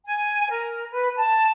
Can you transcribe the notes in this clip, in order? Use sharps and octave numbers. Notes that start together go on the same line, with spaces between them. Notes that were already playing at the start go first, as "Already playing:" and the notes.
G#5
A#4
B4
A5